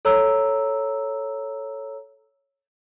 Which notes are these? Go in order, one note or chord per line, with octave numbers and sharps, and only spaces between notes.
A4 C#5 A#5 E6